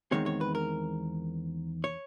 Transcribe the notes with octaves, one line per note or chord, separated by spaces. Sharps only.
E2 C3 D#3 G#3 C4 C#5
C#5
B4
A#4
C#5